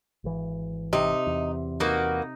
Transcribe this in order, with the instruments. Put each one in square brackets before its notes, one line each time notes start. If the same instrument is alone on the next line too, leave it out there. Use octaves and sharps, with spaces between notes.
[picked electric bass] G#1 E3
[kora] C3 [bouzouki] D#4
[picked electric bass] E2
[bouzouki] A#3 F#4 B4 [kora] D#4